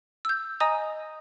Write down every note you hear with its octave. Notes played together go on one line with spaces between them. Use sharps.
E6 G6
D#5 G#5 A#5 D#6